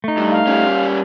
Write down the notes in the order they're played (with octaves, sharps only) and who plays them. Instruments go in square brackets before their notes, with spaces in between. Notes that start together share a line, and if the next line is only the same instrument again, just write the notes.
[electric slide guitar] A3 D#4
[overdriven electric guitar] G2
[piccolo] F5
[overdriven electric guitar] G3 C#4